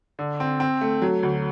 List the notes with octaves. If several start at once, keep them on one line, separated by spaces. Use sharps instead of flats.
D3
C4
C4
A3
F#3
D2